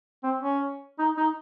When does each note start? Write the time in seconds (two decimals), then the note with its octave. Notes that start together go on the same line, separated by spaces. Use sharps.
0.24 C4
0.42 C#4
0.99 D#4
1.17 D#4